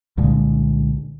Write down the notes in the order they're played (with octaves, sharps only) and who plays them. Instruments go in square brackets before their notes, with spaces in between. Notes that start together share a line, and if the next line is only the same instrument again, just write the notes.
[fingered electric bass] C2 A#2 D3 G#3